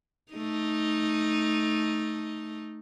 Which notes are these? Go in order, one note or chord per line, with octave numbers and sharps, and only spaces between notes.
A3 D#4